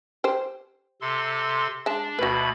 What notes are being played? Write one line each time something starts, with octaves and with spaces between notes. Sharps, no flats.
G4 C5
C3 A4 C6
G#3 D4 A5
D2 B2 F#4 B4 B5